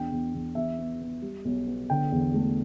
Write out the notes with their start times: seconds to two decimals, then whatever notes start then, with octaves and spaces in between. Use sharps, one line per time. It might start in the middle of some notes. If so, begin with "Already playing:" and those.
Already playing: E2 D4 G5
0.12 E2
0.34 E2
0.55 E2 E5
0.78 B3
1.01 B3
1.22 G3
1.45 B1
1.67 B3
1.90 D3 G5
2.12 E2
2.34 A3